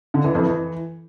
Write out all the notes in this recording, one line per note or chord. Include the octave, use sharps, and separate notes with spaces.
D3
E3
F2
E3